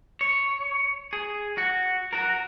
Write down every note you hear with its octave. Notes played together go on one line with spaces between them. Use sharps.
C#5
G#4
F#4
F#4 A#4